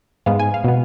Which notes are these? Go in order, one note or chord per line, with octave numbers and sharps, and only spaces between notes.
G#2 G#3 B3 F5
G#5
F5
B2 B3